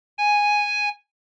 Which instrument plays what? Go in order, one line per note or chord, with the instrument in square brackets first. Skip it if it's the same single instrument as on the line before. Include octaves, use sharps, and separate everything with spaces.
[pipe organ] G#5